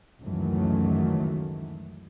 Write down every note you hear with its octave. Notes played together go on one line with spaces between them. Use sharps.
C#2 F#2 D#3 E3 F#3 A3